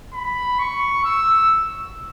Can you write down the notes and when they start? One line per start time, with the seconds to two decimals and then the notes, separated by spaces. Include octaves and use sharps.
0.14 B5
0.59 C#6
1.05 E6